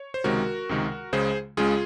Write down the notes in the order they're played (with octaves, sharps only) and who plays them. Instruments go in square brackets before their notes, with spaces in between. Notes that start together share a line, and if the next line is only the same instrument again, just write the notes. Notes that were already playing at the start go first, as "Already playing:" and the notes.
Already playing: [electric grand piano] C#5
C5
C#2 C3 D#3 G#3 F#4 A#4
C#2 C3 D#3 G#3
C#2 C#3 G#3 G#4 C5
C#2 C#3 G#3 F4 G#4